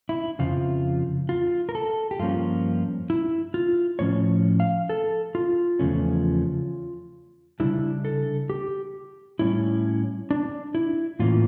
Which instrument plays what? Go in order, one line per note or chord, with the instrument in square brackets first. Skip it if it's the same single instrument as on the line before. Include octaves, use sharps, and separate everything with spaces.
[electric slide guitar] E4
F2 C#3 F3 F4
F4
A#4
A4
G4
G2 F3 A#3 C#4 F4
E4
F4
A2 F3 C#4 C#5
F5
A4
F4
E2 C#3 F3 A3 C#4
C#3 G3 D4 E4
A4
G4
A2 G3 C#4 E4
D4
E4
A2 E3 A#3 C#4 F4